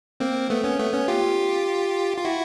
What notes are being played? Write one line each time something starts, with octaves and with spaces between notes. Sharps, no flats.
A#3 C4
A3 B3
B3 C#4
A3 B3
B3 C#4
F4 G4
F4
E4 F#4